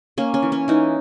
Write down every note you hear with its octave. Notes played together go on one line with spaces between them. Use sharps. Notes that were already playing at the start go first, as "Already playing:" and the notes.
A#3 C#4
C#4
E3
C#4
E3 D#4